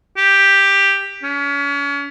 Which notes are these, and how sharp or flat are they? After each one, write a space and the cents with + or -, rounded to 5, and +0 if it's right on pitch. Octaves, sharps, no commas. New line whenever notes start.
G4 +5
C#4 +35